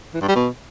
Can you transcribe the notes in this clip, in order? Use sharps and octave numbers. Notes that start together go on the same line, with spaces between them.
E3
G2
G3
B2